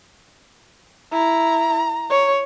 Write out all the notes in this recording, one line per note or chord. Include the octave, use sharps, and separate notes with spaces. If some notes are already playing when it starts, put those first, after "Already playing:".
E4 A#5
C#5